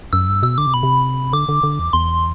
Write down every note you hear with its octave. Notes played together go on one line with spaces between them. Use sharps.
F#2 E6
G2
B2 E6
D3 D6
C3
B2 B5
C3
D3 D6
D3
D3
E2
E2 C6